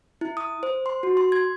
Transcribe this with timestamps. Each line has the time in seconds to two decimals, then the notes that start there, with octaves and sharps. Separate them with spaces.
0.21 E4
0.37 D#6
0.63 C5
0.86 C6
1.03 F#4
1.17 C6
1.32 G#6